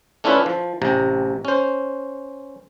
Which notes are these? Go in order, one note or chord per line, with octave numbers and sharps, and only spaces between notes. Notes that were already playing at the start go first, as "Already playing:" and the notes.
A3 C#4 D4 E4 F4 B4
F3
A1 C3 A#5
C#4 C5